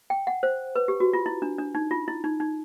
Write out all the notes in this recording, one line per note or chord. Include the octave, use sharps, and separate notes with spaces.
G5
F#5
C5
B4
G4
F#4
F4
E4
D4
D4
D#4
F4
E4
D#4
D#4